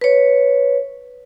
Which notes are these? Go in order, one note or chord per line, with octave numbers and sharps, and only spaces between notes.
B4 C#5